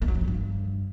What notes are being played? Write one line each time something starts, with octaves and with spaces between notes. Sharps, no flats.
A3
F#3
F2
F#3
G2